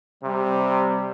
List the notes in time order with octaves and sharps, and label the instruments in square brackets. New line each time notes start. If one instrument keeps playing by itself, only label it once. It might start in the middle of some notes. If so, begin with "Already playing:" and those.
[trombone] C3 [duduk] G3